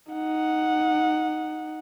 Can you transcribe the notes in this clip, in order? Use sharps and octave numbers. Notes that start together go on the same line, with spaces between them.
D#4 F#5